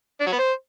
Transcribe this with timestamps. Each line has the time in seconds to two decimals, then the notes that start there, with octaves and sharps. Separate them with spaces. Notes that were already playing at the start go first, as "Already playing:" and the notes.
0.21 D4
0.27 F#3
0.33 B3
0.39 C5